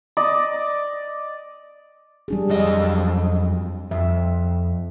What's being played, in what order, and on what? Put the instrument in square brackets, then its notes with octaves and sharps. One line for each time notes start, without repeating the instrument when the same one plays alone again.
[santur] D5 D#5
[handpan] G3 D4 G#4
[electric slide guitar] F2 F#3 D#5 [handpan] G#4
[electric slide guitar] F2 [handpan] E5